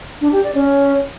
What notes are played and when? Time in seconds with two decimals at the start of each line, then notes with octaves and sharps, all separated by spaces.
0.21 D4
0.32 G4
0.44 D5
0.55 C#4